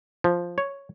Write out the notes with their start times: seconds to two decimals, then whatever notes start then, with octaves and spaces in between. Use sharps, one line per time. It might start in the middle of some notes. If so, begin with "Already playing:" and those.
0.24 F3
0.58 C#5